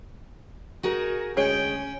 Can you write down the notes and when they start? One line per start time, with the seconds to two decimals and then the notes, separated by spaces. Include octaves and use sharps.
0.83 D#4 F#4 G#4 A#4
1.37 D2 G#3 C#4 G#4 C#5 G5